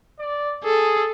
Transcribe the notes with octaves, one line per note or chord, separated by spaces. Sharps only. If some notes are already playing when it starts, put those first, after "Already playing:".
D5
G#4 A4